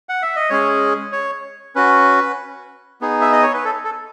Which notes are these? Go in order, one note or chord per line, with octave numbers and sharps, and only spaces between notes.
F#5
E5
D#5
G#3 C#4 G#4 C#5
C#5
C#4 F#4 B4
B3 D#4 G#4
E5
D#5
C#5
B4
A4
A4